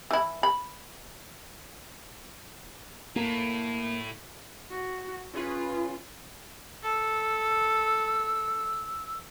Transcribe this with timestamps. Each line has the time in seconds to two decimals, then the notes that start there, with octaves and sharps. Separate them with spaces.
0.11 E3 E4
0.43 B5
3.16 A2 A#3
4.71 F#4
5.33 C#4 F4 G#4 B4
6.83 A4 E6